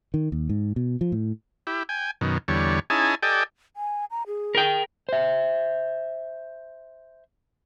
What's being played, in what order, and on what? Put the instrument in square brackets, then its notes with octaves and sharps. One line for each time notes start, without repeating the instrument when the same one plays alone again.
[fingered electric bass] D#3
D#2
G#2
B2
F3
A2
[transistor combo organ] E4 G4
G5 G#5
F#2 B2 D#3
E2 D3 G3 C#5
C#4 D#4 E4 G#4 G#5 A5
G4 A4 D5 D#5 G5 G#5
[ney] G#5
A#5
G#4
[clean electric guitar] A#4 G5
[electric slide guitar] C5 E5